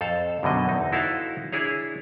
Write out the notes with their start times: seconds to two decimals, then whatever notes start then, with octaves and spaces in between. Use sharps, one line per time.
0.01 F2 A4 C5 F5
0.43 F#2 B2 D3 D#5
0.69 E2 D#4
0.92 D#4 E4 F#4 A4 C5 F5
1.53 D4 E4 G#4 C#5